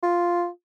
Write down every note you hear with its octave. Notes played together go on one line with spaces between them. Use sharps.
F4